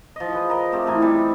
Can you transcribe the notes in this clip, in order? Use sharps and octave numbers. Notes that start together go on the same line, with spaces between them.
F3 D#5
G#4 B4
A#4 D#5
A3 C4 G4 F5
A2 E3 D#4 G#5
C3 G3 E5